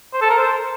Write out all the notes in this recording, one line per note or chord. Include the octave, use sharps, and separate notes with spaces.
C5
A4
A#4
C5